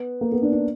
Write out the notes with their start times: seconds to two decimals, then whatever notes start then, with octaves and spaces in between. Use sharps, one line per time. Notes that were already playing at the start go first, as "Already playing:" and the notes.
Already playing: B3
0.21 A#3
0.32 B3
0.42 D4
0.52 D4